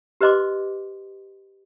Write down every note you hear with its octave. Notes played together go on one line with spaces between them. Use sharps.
G4 B4 C5 D#5 C6 D6